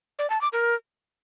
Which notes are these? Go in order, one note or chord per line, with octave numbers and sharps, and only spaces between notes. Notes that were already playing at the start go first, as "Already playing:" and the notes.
D5
A5
D6
A#4